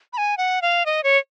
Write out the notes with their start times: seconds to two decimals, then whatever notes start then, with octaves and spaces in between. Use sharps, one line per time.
0.13 B5
0.18 G#5
0.38 F#5
0.62 F5
0.86 D#5
1.04 C#5